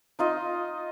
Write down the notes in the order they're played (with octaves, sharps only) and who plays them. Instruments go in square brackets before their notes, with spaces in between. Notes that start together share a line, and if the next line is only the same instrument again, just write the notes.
[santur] D#4 F4 D#5